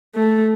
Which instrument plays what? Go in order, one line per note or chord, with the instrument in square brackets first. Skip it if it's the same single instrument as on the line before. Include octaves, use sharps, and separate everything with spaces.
[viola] A3